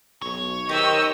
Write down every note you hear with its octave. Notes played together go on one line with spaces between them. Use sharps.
B1 C#5
D#3 G4 C5 D#5 C#6 E6